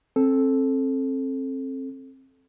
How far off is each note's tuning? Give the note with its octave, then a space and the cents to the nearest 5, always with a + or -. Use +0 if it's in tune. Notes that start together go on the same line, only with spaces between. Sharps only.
C4 +25 A4 -5